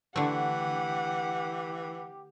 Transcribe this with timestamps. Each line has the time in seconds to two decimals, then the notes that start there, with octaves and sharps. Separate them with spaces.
0.16 D3 E3 A3 G4 F#5